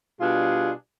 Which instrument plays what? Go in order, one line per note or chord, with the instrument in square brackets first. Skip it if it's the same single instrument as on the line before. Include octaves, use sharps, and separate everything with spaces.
[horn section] B2 G3 D4 F4 G#4